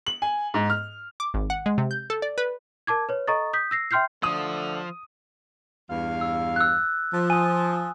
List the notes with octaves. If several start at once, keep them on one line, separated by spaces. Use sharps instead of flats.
F#7
G#5
G#2
F6
D6
G#1
F#5
G#3
C3
G6
A4
D5
B4
A#4 A5 D6 G#6
B4 C#5
A4 D#5 A#5 C#6 D#6 A6
D#6 G6 B6
E6 A#6 C7
E5 G5 C6 F6 G6 C7
D3 F3 A3 A4 D#6
E2 G2 F5
E6
E6 F#6
F3
G#5 D#6